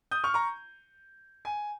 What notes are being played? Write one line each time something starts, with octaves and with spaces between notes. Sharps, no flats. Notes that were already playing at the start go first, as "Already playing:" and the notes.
D#6 G6
C#6 F6
A#5 C#6
G#5